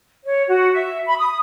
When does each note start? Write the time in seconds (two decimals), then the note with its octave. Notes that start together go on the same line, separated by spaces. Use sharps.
0.24 C#5
0.48 F#4
0.72 E5
1.06 B5
1.18 D#6